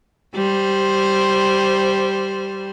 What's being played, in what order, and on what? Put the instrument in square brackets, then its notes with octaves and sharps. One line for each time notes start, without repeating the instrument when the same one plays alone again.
[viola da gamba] G3 C5